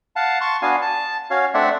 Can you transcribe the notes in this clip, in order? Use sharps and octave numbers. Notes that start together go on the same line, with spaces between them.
F5 F#5 A5
A5 C6 C#6
B3 D4 F#4 F5 G#5
A5
C#4 F#4 C#5 F5
A3 C4 D4 D5 E5 F#5